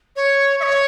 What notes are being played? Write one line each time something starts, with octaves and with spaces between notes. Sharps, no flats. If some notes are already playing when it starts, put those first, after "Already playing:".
C#5
E5
C#5